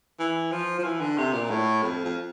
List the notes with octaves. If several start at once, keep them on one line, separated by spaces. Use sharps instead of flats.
E3
F3
F3
E3
D3
C3
A#2
A2
F2
F2